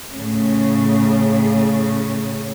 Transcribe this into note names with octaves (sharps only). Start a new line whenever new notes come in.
A2 C#3